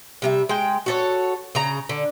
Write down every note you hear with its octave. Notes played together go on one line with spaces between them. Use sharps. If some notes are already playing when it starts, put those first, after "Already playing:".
C3 G3 E5
G#3 G5
F#4 A4 C#5
C#3 A#5
D3